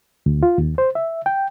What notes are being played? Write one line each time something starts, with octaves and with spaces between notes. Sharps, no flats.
D2
F4
D#2
C5
E5
G5